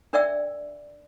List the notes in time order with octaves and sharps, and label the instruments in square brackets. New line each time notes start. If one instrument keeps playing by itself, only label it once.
[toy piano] D4 A#4 D5 E5 G5 E6